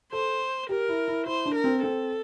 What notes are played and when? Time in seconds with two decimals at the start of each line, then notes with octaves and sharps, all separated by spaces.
0.13 A4 C5
0.69 G4 A#4
0.88 E4
1.08 E4
1.26 E4 C5
1.46 D4
1.55 A#4
1.64 C4
1.83 C4 A4